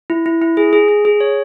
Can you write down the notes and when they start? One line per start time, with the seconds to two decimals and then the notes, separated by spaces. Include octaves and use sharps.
0.10 E4
0.26 E4
0.42 E4
0.57 G#4
0.73 G#4
0.88 G#4
1.05 G#4
1.20 C#5